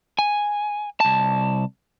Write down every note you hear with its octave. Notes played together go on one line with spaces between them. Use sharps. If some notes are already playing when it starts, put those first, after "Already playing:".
G#5
C2 A5